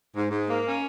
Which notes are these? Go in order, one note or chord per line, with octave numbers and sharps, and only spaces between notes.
G#2
G#2
A#3
C#4